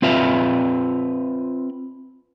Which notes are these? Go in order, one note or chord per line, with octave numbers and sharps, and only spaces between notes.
C4 F4 B4 E5 F5